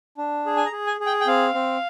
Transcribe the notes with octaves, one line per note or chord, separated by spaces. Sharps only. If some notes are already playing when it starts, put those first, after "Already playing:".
D4
G#4
G#5
A#5
G#4
G#5
G#4
G5
G5
C4 F5
C4